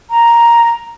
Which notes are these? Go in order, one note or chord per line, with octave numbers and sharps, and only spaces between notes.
A#5